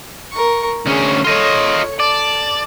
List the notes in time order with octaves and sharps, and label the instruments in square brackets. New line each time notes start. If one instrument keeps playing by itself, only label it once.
[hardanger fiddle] A#4 C#6
[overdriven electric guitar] D2 C#4 [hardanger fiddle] G#4
[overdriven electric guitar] F4 D#5 [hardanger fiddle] A4 C#5
[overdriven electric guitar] D5 [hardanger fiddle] A5